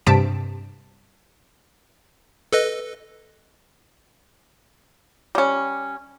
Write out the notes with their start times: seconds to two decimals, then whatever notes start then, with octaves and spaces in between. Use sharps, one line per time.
0.07 G2 C3 A5 B6 D7
2.53 A4 B4 D#5
5.35 G3 C#4